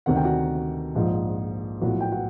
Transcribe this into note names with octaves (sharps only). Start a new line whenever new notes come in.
D2 C3 D#3 F#5
G5
F#4 F#5
A#1 G#2 F3
B1 A2 F3 F#4 F#5
G5
F#4 F#5